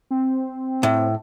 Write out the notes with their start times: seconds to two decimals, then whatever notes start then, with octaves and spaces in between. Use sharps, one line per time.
0.11 C4
0.83 A2